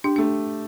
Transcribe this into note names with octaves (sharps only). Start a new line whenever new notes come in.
D4 G4
A3 D4